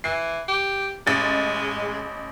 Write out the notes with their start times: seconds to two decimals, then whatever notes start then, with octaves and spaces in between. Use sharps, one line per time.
0.04 E3 C7
0.48 G4
1.07 A1 G#3 A6